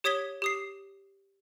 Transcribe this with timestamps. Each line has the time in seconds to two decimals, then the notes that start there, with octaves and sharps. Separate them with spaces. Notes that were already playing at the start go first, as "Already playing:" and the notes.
0.04 G4 C#5 D#6 G#6 B6 G7
0.42 G4 D#6 C7